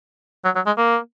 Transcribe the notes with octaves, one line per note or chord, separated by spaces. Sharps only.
F#3
F#3
G#3
A#3